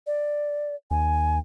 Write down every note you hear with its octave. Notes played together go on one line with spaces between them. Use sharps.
D5
D#2 G#5